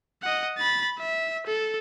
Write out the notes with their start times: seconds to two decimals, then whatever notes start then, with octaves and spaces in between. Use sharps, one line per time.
0.23 D#5 F#5
0.58 B5 A6
0.98 E5
1.47 A4